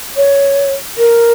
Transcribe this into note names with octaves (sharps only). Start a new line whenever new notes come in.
C#5
A#4